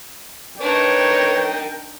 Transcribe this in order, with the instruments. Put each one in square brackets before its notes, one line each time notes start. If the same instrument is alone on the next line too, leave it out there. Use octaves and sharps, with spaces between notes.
[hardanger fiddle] D4 D#4 [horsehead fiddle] A#4 G5 [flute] B4 [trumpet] C#5